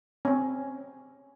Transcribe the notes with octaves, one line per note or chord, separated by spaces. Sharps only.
C4 C#4